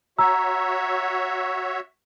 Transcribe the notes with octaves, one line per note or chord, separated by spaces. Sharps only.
F#4 C#5 E5 A#5 E6